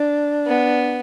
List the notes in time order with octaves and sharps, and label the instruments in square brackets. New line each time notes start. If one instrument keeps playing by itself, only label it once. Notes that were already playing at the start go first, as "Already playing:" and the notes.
Already playing: [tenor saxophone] D4
[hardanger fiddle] B3